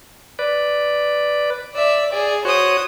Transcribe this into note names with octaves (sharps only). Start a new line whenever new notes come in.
B4 D5
D5 E5
G#4 D5
F#4 C5 C#5 D#6